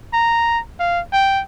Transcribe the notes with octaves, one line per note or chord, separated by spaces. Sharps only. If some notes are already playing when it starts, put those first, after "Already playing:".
A#5
F5
G5